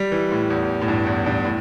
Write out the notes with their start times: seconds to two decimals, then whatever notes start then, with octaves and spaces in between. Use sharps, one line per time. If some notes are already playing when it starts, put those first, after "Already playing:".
Already playing: G3
0.12 E3
0.32 A2
0.50 E2
0.81 A2
0.88 G2
1.07 E2
1.26 G2
1.45 A2